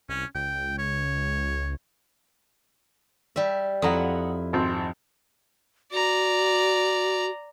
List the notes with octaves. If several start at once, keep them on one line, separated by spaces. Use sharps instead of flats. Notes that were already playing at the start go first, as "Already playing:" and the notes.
C2 C#4
C#2 G5
C#5
G3 E5
F2 E4 F#5 A#5 D#6
G#1 C4
F#4 D5 A#5